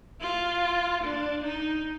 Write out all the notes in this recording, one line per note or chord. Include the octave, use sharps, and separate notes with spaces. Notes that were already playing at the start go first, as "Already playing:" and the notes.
F4
D4
D#4